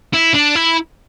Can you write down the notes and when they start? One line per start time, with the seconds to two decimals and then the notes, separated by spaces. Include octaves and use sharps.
0.13 E4
0.34 D4
0.55 E4